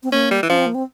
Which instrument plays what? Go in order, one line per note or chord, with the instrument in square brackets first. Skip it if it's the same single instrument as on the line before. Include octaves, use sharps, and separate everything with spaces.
[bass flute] C4
[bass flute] A#3 [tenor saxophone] C#4
[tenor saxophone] G3
E3
[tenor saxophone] F3 [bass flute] C#4
[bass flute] C4
A#3
C4